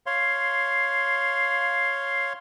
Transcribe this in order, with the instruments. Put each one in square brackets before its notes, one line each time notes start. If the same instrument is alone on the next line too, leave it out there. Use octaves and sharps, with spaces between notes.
[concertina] C#5 F5 C6